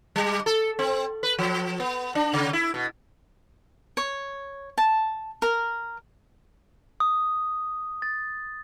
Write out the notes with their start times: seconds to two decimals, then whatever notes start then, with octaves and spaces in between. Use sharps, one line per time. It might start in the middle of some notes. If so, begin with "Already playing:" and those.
0.16 G3
0.46 A4
0.79 C4
1.23 B4
1.39 F3
1.80 B3
2.15 D4
2.33 C#3
2.53 E4
2.74 B2
3.97 C#5
4.78 A5
5.42 A#4
7.00 D#6
8.02 A6